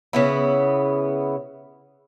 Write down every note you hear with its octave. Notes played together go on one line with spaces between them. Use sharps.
C#3 B3 E4